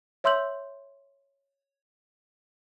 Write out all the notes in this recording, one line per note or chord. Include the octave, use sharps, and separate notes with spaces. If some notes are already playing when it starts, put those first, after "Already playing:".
C#5 E5 C6 E6 G6 F#7